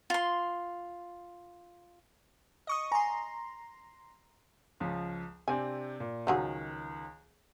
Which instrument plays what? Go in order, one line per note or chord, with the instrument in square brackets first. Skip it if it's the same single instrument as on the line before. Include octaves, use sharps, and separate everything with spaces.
[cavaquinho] F4 C6
[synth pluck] D#5 C#6 D#6
[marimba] G#5 [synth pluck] A#5 C6
[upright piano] C#2 F3
[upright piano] C3 C4 D4 [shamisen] G#5
[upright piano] A#2
[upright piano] C#2 D#3 [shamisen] F3 F#3 G#4